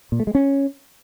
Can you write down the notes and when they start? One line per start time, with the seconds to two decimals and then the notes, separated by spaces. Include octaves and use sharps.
0.12 A#2
0.20 A3
0.27 G#3
0.35 C#4